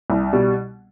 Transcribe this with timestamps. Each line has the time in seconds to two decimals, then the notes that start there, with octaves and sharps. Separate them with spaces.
0.10 C2
0.33 B2 G3